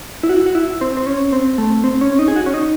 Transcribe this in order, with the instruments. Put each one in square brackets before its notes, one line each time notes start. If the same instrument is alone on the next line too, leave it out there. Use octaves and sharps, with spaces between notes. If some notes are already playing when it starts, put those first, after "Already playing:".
[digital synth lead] E4
F#4
F#4
E4
C4
C4
C#4
C4
A3
C4
C#4
D#4
G#4
F#4
C#4
D#4